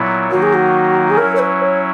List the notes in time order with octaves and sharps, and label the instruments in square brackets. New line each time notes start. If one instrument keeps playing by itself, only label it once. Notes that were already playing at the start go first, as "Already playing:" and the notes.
Already playing: [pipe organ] A#2 F#3 B3 E4
[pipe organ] D#3 F#3 A#3 D#4 [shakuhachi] F#4
[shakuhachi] G#4
F#4
G#4
[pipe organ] F#3 C#4 E4 [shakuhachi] A#4
[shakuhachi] C#5
B4
C#5